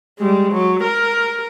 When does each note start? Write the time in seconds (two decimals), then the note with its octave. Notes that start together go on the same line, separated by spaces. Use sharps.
0.19 G3 G#3
0.52 F#3
0.83 A#4